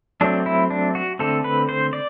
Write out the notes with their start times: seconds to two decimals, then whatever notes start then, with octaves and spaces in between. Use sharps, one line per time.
0.21 F#3 A3 C4 D4
0.46 E4
0.70 D4
0.95 F#4
1.19 D3 A3 C4 A4
1.44 B4
1.69 C5
1.93 D5